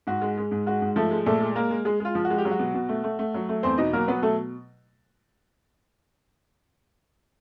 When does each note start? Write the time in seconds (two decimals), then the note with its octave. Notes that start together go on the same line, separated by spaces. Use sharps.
0.07 G#2 F#4
0.22 G#3
0.38 G#3
0.51 G#2
0.66 G#3 F#4
0.82 G#2
0.96 F3 A3 A4
1.11 G#3
1.26 A#2 A3 A4
1.40 G#3
1.55 G#3 A#3 A#4
1.70 G#3
1.85 G#3 G#4
2.00 G#3 F4
2.15 F3
2.25 F#4
2.30 G#3
2.38 G4
2.45 F#3
2.51 F#4
2.59 B2
2.74 B2
2.89 A3
3.04 A3
3.19 A3
3.34 F#3
3.49 A3
3.63 E2 C4 C5
3.78 B2 D#4 D#5
3.93 F#3 A#3 A#4
4.08 F#3 B3 B4
4.22 B2 A3 A4